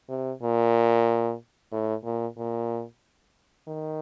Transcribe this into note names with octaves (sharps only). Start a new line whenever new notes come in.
C3
A#2
A2
A#2
A#2
D#3